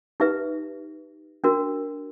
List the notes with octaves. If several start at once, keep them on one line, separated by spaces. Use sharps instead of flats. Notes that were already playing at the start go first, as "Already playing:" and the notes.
D#4 G4 B4 E5
D4 F#4 A#4